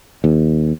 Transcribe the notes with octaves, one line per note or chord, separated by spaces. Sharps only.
D#2